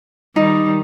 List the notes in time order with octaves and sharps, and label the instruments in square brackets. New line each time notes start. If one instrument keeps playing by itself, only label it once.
[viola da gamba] D#3 G3 [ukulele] D#4